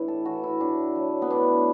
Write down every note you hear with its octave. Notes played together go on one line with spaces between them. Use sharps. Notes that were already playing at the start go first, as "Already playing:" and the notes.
Already playing: A2 E3 D4 E4
A4
E3 F#4
E4
A2 D4
F#3
B3
A2 D4